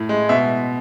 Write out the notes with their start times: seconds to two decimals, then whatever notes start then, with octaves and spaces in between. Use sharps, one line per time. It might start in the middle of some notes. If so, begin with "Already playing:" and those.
Already playing: A2
0.09 G#3
0.29 B2 E5